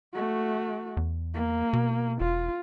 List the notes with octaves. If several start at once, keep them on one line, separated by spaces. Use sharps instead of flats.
A3 F#4
E2
A#3
B2
E1 F4